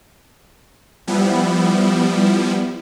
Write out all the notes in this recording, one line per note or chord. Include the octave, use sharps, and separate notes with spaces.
F3 G3 B3 E4